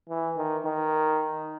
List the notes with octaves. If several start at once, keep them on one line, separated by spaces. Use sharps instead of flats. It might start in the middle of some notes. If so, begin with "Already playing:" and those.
E3
D#3
D#3